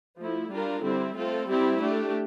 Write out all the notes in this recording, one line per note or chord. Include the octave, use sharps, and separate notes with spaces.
F3 A3 E4
G3 D4 F4 A#4
D3 G3 C4 E4
A3 C4 F4 A4
G3 C4 E4 G4
A3 D4 G4